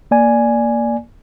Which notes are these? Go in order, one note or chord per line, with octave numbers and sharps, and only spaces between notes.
A#3 D5 G#5